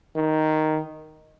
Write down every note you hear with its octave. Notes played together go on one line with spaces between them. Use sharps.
D#3